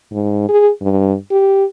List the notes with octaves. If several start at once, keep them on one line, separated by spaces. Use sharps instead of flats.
G#2
G#4
G2
G4